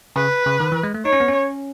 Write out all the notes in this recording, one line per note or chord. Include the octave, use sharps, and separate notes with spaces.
C#3 B4
C#3
D#3
E3
G#3
A3
D#4 C#5
C#4
B3
C#4